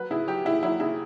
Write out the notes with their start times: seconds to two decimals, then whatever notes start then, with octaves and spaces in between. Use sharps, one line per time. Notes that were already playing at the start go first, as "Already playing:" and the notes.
Already playing: F#3 B4
0.11 C#3 E4
0.27 F#3 G4
0.45 C#3 E4
0.63 F#3 E4
0.80 C#3 E4